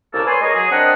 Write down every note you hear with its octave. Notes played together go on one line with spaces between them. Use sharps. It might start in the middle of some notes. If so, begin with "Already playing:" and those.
C2 C#3 A#3 A4 A5
B4 C#5 D5 G#5 C6
G#3 A#4 C#5 D#5
F#3 G#4
C4 D4 A#4 D#5 F#5